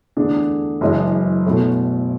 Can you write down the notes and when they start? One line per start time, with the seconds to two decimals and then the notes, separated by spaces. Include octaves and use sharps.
0.17 E2 D3 A3 D4 G#4
0.81 F#1 F#2 E3 G#3
1.46 B2 A3 E4 A4 C#5